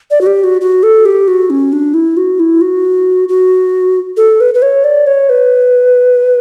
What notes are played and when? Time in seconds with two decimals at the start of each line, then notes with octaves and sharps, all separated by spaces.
0.11 D5
0.21 F#4
0.26 G4
0.44 F#4
0.61 F#4
0.83 A4
1.05 G4
1.28 F#4
1.50 C#4
1.72 D4
1.94 E4
2.17 F#4
2.39 E4
2.61 F#4
3.28 F#4
4.17 A4
4.40 B4
4.54 B4
4.62 C#5
4.84 D5
5.07 C#5
5.29 B4